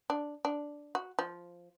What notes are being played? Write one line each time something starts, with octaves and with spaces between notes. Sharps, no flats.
D4
D4
F#4
F3